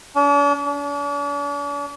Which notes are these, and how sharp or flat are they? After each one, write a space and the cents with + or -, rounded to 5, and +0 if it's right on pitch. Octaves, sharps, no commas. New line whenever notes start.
D4 -45
D4 -45